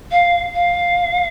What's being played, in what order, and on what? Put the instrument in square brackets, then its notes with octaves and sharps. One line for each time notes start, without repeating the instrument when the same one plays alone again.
[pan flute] F5
F5